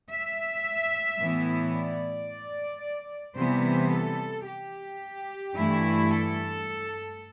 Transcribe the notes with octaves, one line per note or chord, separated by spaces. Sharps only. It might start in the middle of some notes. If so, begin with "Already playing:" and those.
E5
A2 E3 B3 E4
D5
C3 E3 G3 B3 C5
A4
G4
G2 E3 A3 E4
A4